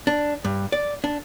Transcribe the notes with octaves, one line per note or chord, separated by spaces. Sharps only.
D4
G2
D5
D4